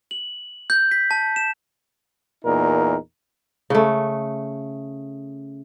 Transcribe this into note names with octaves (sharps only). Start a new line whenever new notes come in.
F#7
G6
B6
A5
E7
E2 A#2 D#4 A#4
C#3 A3